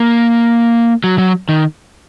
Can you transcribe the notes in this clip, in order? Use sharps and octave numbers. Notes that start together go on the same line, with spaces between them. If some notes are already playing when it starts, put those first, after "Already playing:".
Already playing: A#3
F#3
F#3
D#3